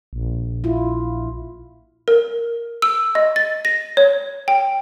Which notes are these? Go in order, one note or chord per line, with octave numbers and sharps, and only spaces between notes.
A#1
E4 F4
A#4
E6
D#5
A6
A#6
C#5
G5